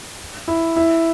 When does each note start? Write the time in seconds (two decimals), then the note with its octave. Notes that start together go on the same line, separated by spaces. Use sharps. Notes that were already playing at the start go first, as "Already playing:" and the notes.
0.48 E4
0.76 E4